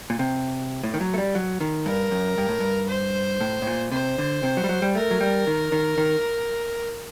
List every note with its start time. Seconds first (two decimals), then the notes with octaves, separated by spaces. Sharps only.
0.10 A#2
0.19 C3
0.83 A2
0.94 D#3
1.01 F#3
1.14 A3
1.18 G3
1.35 F#3
1.60 D#3
1.86 G2 A#4
2.11 F#2
2.38 G2
2.49 A2
2.60 G2
2.89 C5
3.41 A2
3.62 A2
3.67 A#2
3.91 C3 C5
4.18 D3
4.43 C3
4.57 F#3
4.64 G3
4.69 F#3
4.82 G3
4.95 A3 A#4
5.11 F#3
5.21 G3
5.47 D#3
5.72 D#3
5.98 D#3